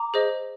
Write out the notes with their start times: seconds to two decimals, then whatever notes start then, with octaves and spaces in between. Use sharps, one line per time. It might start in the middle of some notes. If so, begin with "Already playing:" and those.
Already playing: A#5 D6
0.14 G#4 C5 D#5